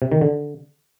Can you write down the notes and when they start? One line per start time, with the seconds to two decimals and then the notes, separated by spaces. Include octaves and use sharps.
0.02 C3
0.12 D#3
0.21 D3